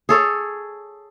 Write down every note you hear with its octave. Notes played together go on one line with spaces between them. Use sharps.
G#4 A4 C#5